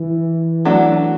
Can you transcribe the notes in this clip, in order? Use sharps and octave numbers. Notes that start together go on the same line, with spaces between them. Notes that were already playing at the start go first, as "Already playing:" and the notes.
Already playing: E3
F#3 A3 D4 F#4